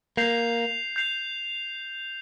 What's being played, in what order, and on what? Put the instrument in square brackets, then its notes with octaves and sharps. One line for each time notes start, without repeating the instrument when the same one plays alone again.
[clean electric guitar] A#3 [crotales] G6 C7 F7
[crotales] G6 C7 F7